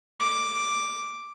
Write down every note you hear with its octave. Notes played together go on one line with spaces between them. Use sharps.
D6